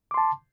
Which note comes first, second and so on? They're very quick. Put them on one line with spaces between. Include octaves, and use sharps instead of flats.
D6 C6 A5